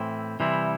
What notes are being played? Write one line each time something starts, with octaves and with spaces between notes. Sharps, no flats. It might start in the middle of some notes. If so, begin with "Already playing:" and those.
Already playing: A2 E3 C4 E4
C3 E3 G3 C4 E4